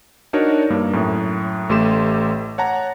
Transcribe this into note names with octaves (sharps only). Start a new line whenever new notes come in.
D4 D#4 F#4 A#4 C#5 D5
G2 A#3
F#2 A2
A1 A3 G4 C6 E7
C#5 F#5 A5 A#5